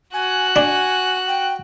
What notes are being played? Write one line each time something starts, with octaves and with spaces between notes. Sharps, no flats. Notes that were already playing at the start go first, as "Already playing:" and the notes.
F#4 G#5 F#6
D4 G#5
G5